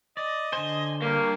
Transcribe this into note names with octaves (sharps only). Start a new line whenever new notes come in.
D5 D#5
D3 C5 G#5
G2 A#3